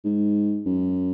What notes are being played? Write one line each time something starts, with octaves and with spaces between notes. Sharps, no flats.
G#2
F#2